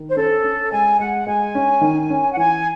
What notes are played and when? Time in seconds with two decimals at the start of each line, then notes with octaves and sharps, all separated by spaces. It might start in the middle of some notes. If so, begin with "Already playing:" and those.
Already playing: D#3
0.09 C5
0.16 C#4 A4
0.44 C#4
0.72 G#3 G#5
0.99 G#3 F#5
1.27 G#3 G#5
1.55 C#4
1.81 D#3
2.10 C#4
2.32 F#5
2.37 E3 G#5